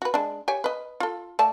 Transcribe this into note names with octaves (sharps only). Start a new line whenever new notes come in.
F#4 B4
G#3 D4
G4 C#5 G#5
B4 D#5
F4 A4
A3 D5 A5